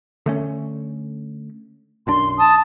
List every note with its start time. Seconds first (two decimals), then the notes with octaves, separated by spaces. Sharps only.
0.26 D3 A3 C#4
2.07 B1 F#2 D4 C6
2.38 A5 D#6